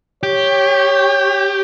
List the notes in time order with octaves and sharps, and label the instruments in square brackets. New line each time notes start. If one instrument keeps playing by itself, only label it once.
[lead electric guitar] G4 [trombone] C#5